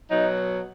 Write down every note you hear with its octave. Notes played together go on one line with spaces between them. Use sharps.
B2 F#3 D#4